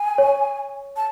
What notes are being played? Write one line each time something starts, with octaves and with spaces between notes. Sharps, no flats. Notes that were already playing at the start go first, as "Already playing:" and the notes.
Already playing: G#5
C#5
A5